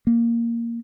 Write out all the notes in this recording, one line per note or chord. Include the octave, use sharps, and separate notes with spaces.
A#3